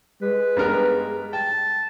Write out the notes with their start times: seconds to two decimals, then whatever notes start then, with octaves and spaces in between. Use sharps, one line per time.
0.22 G#3 B4
0.57 G2 B3 A#4
1.33 G5 A5